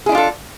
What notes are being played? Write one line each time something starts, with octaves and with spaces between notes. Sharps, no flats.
D4 E4 F4 G#4 A4